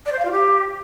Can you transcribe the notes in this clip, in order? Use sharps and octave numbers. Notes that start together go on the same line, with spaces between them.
D5
C5
F5
F4
G4